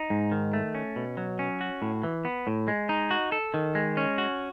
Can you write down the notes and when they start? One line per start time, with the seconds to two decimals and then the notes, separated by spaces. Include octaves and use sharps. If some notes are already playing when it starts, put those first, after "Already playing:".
Already playing: D#4
0.10 G#2
0.32 D#3
0.53 A3
0.75 C#4
0.96 B2
1.17 F#3
1.39 C#4
1.61 F#4
1.82 A2
2.03 E3
2.25 B3
2.47 A2
2.68 G#3
2.89 D#4
3.11 F#4
3.32 A4
3.54 D#3
3.75 G#3
3.97 C#4
4.18 F#4